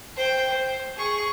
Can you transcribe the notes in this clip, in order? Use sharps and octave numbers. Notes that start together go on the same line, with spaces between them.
C5 G5
C5
G#4 C#6